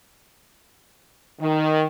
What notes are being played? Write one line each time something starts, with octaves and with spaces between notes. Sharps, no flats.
D#3